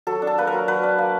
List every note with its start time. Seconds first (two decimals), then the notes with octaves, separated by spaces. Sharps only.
0.07 F#3 A4
0.22 D4
0.27 A4
0.38 A#3 B4
0.47 A#4
0.53 F#3
0.68 F#3 B4
0.83 D4
0.98 A#3